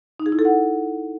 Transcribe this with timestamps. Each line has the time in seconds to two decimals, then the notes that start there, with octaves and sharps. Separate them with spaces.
0.20 D#4
0.26 G#4
0.32 E4
0.39 A4
0.45 F#5